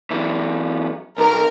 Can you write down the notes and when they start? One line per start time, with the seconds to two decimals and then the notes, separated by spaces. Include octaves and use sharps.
0.11 F#2 E3
1.18 B1 A#4